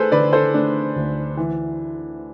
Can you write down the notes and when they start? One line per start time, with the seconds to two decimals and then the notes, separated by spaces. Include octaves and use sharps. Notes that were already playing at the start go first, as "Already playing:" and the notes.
Already playing: A3 G#4 A4 B4 C5
0.12 D3 B4 D5
0.33 A4 C5
0.54 A3 D4
0.96 D2
1.37 E3